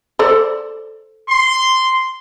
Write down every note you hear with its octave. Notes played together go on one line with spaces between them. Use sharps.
A4 C5 D5
C6